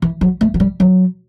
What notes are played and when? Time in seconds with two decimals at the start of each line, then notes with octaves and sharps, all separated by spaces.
0.02 E3
0.21 F#3
0.41 A3
0.54 F#3
0.60 G3
0.80 F#3